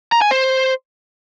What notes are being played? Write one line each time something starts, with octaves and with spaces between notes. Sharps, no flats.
A#5
G#5
C5